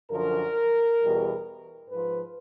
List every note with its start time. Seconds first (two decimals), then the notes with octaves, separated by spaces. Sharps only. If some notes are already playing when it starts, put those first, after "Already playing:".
0.10 F#2 D3 F3 A#4
1.00 E2 B2 G3
1.89 G#2 F3 B4